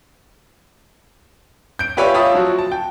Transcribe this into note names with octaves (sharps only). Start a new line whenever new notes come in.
G6 D7
F4 G4 B4 C#5 D5 E5
F4 C#5 E5 A5 B5 D#6
F3 F#3 F#4
A5
G5